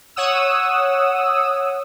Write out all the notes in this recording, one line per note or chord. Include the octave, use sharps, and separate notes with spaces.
C#5 F#5 D#6 E6